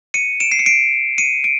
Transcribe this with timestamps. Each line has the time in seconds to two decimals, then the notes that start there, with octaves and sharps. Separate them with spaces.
0.14 C#7 D#7
0.40 D7 E7
0.52 C7
0.59 C#7
0.66 C7 D7
1.18 C#7 D#7
1.44 D7